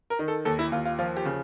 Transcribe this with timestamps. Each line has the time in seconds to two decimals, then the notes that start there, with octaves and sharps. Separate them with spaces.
0.10 A#4
0.19 D#3
0.28 A4
0.45 D#2 A4
0.59 E4
0.72 D#2 F4
0.85 F4
0.99 F3 F4
1.17 G4
1.25 C#3